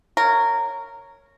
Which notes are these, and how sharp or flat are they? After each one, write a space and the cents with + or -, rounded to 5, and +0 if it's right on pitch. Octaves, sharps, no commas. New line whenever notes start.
A#4 -15 C#5 +0 F5 +40